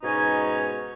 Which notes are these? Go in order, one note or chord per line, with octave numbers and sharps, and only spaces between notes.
G#2 B2 C#4 D#4 G#5